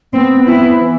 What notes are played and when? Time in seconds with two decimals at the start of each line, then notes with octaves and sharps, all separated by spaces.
0.13 B3 C4
0.47 E4
0.80 E3